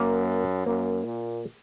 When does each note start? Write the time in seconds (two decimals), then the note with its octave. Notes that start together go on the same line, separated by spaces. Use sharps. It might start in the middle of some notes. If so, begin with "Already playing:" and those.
Already playing: F#2 A#3
0.66 F#2 A#3
1.04 A#2